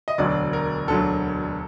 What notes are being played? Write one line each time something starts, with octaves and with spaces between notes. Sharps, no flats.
D#5
E1 D2 D3 F#3 D5
A#4
E1 D2 D3 F#3 A4